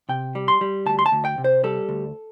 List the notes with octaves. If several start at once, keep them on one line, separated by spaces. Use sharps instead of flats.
C3 G5
G3
C6
G3
D2 A5
C6
A5
D2
G5
C3
C5
G3 A4
D2